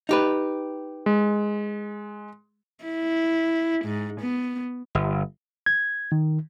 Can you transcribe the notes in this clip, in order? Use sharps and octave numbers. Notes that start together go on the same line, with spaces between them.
D#4 G4 B4
G#3
E4
G#2
B3
G1
G#6
D#3